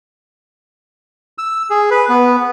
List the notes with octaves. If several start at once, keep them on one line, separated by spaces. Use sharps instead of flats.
E6
G#4
B4
B3